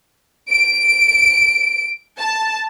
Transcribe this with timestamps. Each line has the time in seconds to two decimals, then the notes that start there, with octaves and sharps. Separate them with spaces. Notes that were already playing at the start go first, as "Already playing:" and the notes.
0.51 D7
2.18 A5